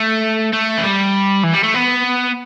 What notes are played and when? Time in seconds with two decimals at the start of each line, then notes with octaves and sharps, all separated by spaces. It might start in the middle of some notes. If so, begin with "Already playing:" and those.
Already playing: A3
0.53 A3
0.78 E3
0.83 G3
1.44 E3
1.54 G3
1.64 A3
1.75 B3